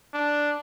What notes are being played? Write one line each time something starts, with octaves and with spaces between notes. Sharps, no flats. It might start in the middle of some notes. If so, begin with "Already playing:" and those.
D4